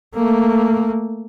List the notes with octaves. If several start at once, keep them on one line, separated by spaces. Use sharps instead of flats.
A3 A#3